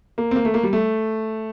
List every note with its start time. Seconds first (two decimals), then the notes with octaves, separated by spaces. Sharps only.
0.18 A#3
0.31 C4
0.36 A#3
0.45 A3
0.54 A#3
0.63 G3
0.73 A3